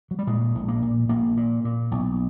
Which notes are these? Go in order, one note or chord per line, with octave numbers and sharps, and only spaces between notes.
F#3
G3
A#2 G#3
A#1
A#3
A#2
A#1 A#3
A#2
A#2
B1